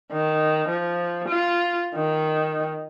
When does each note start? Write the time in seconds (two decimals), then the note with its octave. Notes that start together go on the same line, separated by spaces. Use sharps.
0.12 D#3
0.69 F3
1.28 F4
1.95 D#3